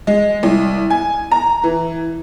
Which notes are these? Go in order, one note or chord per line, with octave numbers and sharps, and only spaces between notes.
G#3
C2
G#5
A#5
E3